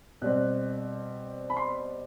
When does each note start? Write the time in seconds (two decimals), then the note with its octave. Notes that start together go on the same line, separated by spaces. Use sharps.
0.22 B2 G3 C4 F#6
1.50 B5
1.57 C6